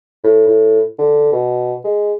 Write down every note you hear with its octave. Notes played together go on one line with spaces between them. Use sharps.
A2
A2
D3
B2
G#3